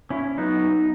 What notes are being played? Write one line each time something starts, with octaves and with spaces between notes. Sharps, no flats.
C#4 E4
F#3 B3 D#4